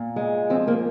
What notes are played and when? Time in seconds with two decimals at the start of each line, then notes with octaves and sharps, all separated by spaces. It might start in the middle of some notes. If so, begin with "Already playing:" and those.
Already playing: A#2
0.16 G#3
0.50 F3 C4
0.68 A#3